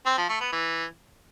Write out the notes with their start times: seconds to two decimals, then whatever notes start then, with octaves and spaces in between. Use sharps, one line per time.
0.06 C4
0.17 F3
0.29 A3
0.41 B3
0.52 E3